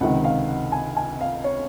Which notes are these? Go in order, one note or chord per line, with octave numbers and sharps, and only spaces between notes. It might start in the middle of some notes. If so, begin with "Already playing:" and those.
C#2 C3 D#3 F#5
F5
F#5
G#5
G#5
F5
C#5